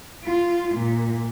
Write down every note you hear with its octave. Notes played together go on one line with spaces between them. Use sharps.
F4
A#2